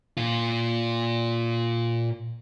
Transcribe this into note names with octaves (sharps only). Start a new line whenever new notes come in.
A#2 F4